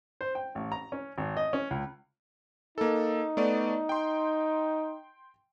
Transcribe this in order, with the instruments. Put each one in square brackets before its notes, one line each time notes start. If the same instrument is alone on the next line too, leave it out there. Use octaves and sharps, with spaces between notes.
[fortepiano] C5
G5
A1
A#5
C#4
G#1
D#5
C#4
C#2
[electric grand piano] A#3 A4 [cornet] D#4
[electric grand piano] A3 B3 D5
G5 C6